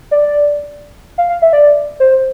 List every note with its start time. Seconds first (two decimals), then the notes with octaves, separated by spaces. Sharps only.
0.11 D5
1.18 F5
1.29 F5
1.42 E5
1.53 D5
2.00 C5